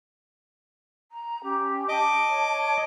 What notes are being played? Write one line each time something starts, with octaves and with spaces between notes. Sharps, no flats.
A#5
C#4 G4
D#5 A5 D6
C#5